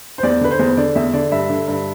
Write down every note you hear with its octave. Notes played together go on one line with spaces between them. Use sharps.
C5
E2 D5
D3 B4
C5
E2
D3 D5
E2 E5
D3 D5
G2 E5
D3
G2